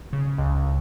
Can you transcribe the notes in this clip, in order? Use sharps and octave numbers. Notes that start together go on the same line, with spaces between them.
C#3
C#2